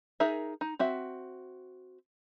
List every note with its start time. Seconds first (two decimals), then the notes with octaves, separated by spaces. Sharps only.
0.20 D#4 G#4 A#4 E5
0.61 D#4
0.79 C4 F#4 E5